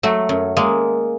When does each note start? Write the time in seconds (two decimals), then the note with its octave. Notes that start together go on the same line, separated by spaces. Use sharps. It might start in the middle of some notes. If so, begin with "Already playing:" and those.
0.03 F#3 A3
0.29 F#2
0.57 G#3 A#3